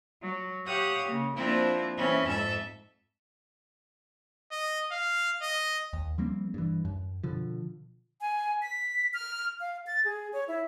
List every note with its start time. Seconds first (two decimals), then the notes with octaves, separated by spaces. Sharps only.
0.22 F#3
0.65 G4 C#5 F5 F#5 D#6 G6
1.07 C#3 A#3
1.36 F3 A#3 C4 D4 E4
1.97 E3 C4 C#4 B5
2.26 F2 G#2 A4 E5
4.52 D#5
4.91 F5
5.42 D#5
5.93 D#2
6.18 F3 G3 A#3 C4
6.54 G2 E3
6.85 F#2
7.23 B2 D3 F3
8.21 G#5
8.62 B6
9.14 F6
9.60 F5
9.87 A6
10.05 G#4
10.33 C#5
10.48 E4